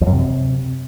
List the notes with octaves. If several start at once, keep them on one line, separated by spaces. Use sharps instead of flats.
F2
F#2
C3